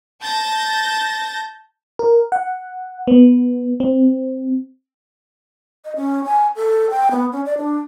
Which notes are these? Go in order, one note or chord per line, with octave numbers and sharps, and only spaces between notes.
A5 G6 A6 A#6
A#4
F#5
B3
C4
D#5
C#4
G#5
A4
G5
B3
C#4
D5
D4